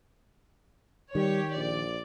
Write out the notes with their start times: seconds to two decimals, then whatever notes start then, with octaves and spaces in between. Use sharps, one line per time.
1.15 D#3 G3 G4 C#5
1.56 A#1 D5